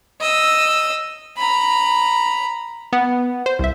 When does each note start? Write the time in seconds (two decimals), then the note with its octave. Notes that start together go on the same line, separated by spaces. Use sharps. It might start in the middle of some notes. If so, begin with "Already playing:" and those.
0.21 D#5 E6
1.37 A#5 B5
2.93 B3
3.46 C5
3.59 C2 E5